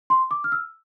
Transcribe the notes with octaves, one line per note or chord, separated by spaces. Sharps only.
C6
D6
F6
E6